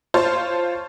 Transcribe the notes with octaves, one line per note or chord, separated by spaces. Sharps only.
F4 C5 C#5 A5